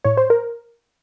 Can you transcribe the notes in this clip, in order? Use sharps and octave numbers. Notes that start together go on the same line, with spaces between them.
A2 C#5
C5
A#4